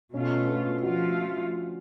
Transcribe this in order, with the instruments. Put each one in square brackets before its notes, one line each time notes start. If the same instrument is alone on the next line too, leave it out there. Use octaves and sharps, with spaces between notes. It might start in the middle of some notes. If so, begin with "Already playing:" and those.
[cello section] B2 A3 F4 [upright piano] C#4
[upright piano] D4
[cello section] F3 A3 F4 [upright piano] F#4